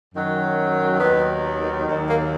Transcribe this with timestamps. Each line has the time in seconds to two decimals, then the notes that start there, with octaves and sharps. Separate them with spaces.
0.14 F#2 D#3 F#3
1.00 D#2 D#3 F#3 B3
1.86 D#2 D#3 F#3
2.08 A#3